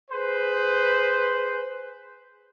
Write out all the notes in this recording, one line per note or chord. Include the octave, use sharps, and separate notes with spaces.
G#4 B4 C5